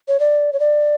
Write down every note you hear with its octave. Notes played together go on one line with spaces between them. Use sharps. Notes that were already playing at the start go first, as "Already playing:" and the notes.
C#5
D5
C#5
D5